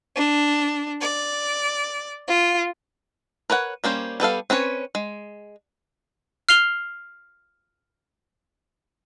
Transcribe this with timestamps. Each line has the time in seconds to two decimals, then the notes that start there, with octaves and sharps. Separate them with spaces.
0.16 D4
1.01 D5
2.27 F4
3.50 A#4 B4 C#5 F#5
3.84 G3 A#3 C#4 C5
4.20 G3 B3 A4 F5
4.50 C4 C#4 B4 C#5
4.95 G#3
6.49 F6 C7 F7 G7